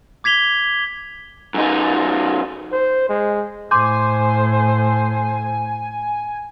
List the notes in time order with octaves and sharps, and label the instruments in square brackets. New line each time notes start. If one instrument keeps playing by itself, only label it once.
[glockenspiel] D6 G#6 B6 F7 G7
[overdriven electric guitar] F#2 D#4
[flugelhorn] C5
G#3
[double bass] A2 [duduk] C5 [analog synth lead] G#5 [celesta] C6 D6 G6